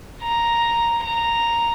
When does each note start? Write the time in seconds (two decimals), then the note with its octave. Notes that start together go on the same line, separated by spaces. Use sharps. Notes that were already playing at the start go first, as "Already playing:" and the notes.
0.23 A#5
1.04 A#5